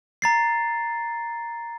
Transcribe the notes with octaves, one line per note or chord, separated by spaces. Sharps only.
A#5 A6 C7